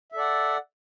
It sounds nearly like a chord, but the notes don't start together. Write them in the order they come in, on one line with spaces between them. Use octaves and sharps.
E5 A4 D5 F#5